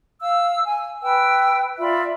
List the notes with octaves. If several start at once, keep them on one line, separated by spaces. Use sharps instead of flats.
F5 E6
G#5
B4 G5 E6
F4 D5 E5 B5